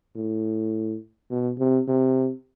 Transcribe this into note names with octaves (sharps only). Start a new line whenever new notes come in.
A2
B2
C3
C3